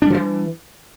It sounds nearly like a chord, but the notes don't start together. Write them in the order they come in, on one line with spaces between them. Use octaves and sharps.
D4 G3 F3 E3